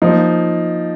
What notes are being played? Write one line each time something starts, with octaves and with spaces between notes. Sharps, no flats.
F3 A#3 D#4